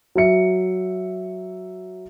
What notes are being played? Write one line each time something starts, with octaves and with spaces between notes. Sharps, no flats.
F#3 E5 C#7